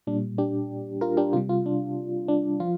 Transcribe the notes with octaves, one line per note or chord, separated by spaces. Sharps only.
A#2 G3 D4
D4 G4
F4 A#4
D4 G4
C3 G3 F4
F4
D4
D4
F3 F4